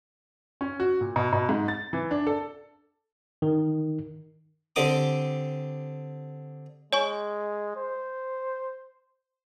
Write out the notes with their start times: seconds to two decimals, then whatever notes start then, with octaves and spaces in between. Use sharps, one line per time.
0.61 C#4
0.80 F#4
1.01 A#2
1.16 B2
1.33 B2
1.49 G#2
1.68 A6
1.93 E3
2.11 D4
2.27 A4
3.42 D#3
4.76 D3 C4 G4 D6 D#6
6.93 G#3 C#5 G#5 C#6
7.76 C5